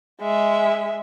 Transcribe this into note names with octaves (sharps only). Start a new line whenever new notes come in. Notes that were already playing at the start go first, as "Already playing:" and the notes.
G#3 E5